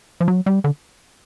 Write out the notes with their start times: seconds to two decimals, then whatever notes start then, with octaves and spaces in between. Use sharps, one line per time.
0.21 F3
0.28 F#3
0.46 G3
0.64 D3